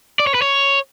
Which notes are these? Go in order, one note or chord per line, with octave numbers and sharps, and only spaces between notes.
D5
C#5
B4
C#5